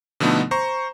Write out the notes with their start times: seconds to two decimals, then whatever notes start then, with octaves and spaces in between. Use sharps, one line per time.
0.20 B2 D3 F3 A3 B3 D#4
0.51 C5 A#5 C#6